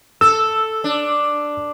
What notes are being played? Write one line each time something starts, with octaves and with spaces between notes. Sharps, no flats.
A4 E6
D4